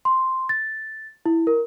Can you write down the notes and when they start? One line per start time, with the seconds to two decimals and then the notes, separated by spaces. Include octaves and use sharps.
0.05 C6
0.49 A6
1.26 E4
1.47 A#4